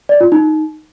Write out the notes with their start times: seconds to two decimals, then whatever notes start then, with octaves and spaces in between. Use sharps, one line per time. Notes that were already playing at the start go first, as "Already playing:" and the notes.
0.09 D5
0.21 F4
0.32 D#4